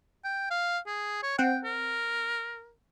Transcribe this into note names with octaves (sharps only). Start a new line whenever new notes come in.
G5
F5
G#4
C#5
C4 F#5 G5
A#4